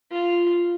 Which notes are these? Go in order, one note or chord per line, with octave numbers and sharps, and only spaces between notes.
F4